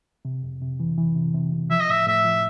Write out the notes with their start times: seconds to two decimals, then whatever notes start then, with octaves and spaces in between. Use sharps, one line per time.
0.25 C3
0.43 F2
0.62 C3
0.80 E3
0.98 E3
1.15 C3
1.34 C3
1.53 C3
1.70 F3 E5
1.80 D#5
1.89 A2 E5
2.07 A2 E5
2.25 F3